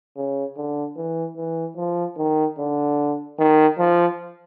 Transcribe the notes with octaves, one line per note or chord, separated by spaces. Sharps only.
C#3
D3
E3
E3
F3
D#3
D3
D#3
F3